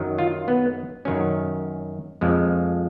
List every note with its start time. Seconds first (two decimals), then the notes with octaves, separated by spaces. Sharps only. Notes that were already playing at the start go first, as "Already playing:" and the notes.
Already playing: F#2 D#3 F#3
0.18 F4
0.48 B3
1.05 F#2 D#3 F#3 C#4
2.21 F2 F3 G#3